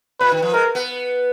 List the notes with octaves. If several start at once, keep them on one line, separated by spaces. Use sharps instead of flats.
A#2 B4
D#3
F3
G#3 A#4
B3